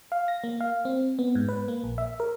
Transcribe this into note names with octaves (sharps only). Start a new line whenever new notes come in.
F5
A#6
A#3
F5
C4
B3
G#2
B4
A#3
A#1
E5
A#4